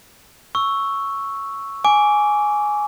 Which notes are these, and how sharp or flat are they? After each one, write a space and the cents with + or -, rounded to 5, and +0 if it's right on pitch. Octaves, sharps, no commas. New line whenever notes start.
C#6 +0 E6 +0
G#5 +5 D6 -20